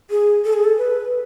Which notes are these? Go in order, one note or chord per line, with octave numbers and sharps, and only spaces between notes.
G#4
A4
G#4
A4
B4